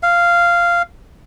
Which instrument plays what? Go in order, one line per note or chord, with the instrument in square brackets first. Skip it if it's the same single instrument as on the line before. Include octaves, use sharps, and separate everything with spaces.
[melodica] F5